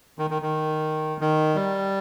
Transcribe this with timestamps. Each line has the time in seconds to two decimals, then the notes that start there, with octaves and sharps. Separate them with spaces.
0.19 D#3
0.30 D#3
0.42 D#3
1.21 D#3
1.55 G3